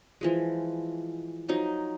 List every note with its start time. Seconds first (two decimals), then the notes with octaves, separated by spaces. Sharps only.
0.21 E3 F3 G#3
1.48 F3 F#3 D#4